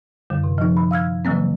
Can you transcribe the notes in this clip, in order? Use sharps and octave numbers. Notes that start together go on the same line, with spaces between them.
F#2 D3 G3
C3
F3 D#4
B5
F5 E6 F6 G#6
C#3 E3 F#3 A#3 C4